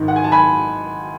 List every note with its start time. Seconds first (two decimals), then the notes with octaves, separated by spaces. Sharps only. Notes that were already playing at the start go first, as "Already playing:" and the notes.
Already playing: G#1 G#2 D#3
0.08 F#5
0.16 G#5
0.24 A5
0.32 G#5 B5